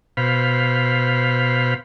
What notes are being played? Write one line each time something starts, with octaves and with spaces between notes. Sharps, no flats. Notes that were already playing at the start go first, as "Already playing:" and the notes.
B2 C5 F5 B5